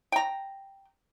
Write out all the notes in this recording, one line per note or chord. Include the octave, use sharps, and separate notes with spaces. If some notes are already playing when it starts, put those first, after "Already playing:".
G5 A#5